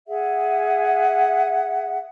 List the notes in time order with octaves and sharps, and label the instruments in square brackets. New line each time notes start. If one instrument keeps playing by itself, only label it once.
[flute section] G#4 E5 F#5